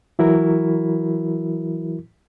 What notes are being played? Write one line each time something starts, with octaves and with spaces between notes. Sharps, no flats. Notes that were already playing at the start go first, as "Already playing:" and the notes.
E3 F#3 E4 F#4 A#4